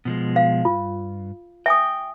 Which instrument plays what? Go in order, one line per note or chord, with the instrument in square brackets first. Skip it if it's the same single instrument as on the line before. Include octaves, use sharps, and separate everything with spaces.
[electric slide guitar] B2 F3 G#3
[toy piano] F5
[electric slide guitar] G2 [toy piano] F4
[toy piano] E5 G#5 D#6 [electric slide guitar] G5